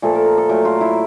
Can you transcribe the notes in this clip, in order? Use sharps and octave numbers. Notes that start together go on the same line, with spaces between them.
A#2 F3 A3 A4
A#4
A#4
A4
A#2 F#3 A3 A#4
F4
E4